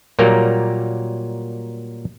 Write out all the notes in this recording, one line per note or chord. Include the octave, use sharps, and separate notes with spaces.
A#2 F#3 G3 A#3 A#4